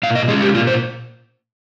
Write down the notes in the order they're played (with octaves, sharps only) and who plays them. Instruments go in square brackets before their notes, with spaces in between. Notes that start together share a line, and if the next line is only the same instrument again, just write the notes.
[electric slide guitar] A#2 F5
D#5
G#3 C#4 G#4
G4
A#2 F4
C5